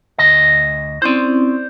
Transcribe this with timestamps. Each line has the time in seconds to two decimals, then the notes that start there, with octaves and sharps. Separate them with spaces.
0.18 D2 D#5
1.02 C4 C#4 E4 C5 D5